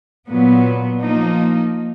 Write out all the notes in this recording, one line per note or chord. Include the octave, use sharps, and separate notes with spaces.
A#2 F#3 B3
F3 A#3 D#4